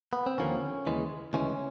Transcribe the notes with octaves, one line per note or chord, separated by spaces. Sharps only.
B3
C4
D#2 D3 F3 A#3 C#4
D#2 C#3 E3 G#3
D2 C#3 E3 G#3 C#4